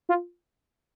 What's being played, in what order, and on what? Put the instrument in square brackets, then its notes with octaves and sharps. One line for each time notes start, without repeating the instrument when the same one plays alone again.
[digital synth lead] F4